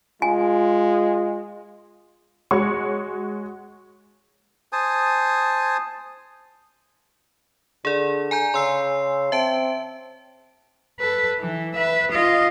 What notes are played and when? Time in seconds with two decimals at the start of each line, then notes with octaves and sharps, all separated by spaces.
0.22 G#3 F4 G#5
2.51 G#3 F#4 C#5 C#6
4.72 C5 G#5 A5 D#6
7.85 D3 G#4 D5
8.31 G#5 A#5 G6
8.54 C#3 C6 E6 C7
9.32 C4 E5 A5 D7
11.00 A4 B4
11.39 E3
11.74 B4 E5
12.12 F4 D#5